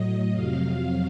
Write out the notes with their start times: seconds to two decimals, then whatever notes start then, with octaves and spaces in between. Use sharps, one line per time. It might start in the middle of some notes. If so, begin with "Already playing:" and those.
Already playing: A2 F#3 D#5
0.33 F2 C3 F#3 F5